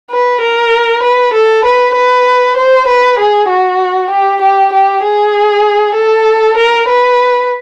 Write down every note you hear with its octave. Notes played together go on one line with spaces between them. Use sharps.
B4
A#4
B4
A4
B4
B4
C5
B4
G#4
F#4
G4
G4
G4
G#4
A4
A#4
B4